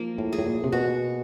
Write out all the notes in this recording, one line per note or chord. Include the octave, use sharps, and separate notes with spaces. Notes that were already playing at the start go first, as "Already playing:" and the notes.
Already playing: F3 A#3 D#4
A2
G#4
A2
A#2
C3
B2 F#4